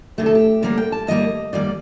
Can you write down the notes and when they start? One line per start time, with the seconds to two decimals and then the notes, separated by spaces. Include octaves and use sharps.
0.18 D2 C3 D#3 A3 G4
0.26 A4
0.35 G4
0.62 D#2 D3 G3 A#3 A#4
0.78 G5
0.92 A5
1.07 D#2 D#3 G3 A#3 D#5
1.53 F#2 D#3 G3 A#3 D5